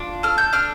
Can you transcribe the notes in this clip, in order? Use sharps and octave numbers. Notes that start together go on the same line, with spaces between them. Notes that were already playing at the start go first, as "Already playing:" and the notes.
Already playing: D4 F4
A4 F6
G6
D4 F6